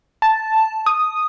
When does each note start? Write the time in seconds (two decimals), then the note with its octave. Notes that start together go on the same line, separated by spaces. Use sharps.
0.22 A5
0.86 D#6